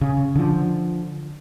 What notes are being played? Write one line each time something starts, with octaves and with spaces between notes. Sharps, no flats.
C#3
D3 F3